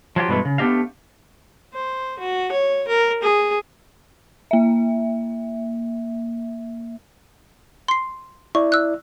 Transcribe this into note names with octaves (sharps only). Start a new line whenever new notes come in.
F3 F#3 F4 G4
G2 B2 E3 G#3 A3
C#3
A3 B3 D4 G4 D#5 F5
C5
F#4
C#5
A#4
G#4
A#3 E5
C6 C7
E4 D5 C#6
E6 F#6